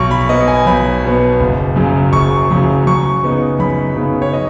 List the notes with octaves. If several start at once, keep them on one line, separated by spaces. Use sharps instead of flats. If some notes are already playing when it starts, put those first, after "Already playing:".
Already playing: B1 C#6
B5
B2 B3 D#5
G#5
B1 B5
B2 B3
F#1
F#2 C#3 F#3
F#1 C#6
F#2 C#3 F#3
F#2 C#6
C#3 B3 D#4
F#2 B5
C#3 B3 D#4
C#5
D#5